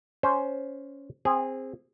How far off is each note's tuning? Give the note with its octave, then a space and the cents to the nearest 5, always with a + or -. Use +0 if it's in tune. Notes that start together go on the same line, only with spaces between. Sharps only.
C#4 +10 C5 +0
C4 +5 G#4 -20